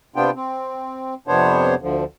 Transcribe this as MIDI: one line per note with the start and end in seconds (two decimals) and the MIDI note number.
0.16 0.31 48
0.16 0.31 59
0.16 0.31 62
0.16 0.31 65
0.16 0.31 79
0.35 1.14 60
1.27 1.75 41
1.27 1.75 48
1.27 1.75 59
1.27 1.75 62
1.27 1.75 72
1.27 1.75 73
1.82 2.04 38
1.82 2.04 50
1.82 2.04 53